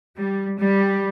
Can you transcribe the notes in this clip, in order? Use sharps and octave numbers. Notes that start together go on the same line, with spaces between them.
G3
G3